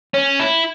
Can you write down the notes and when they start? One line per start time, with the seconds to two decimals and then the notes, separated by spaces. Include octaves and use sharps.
0.14 C#4
0.40 E4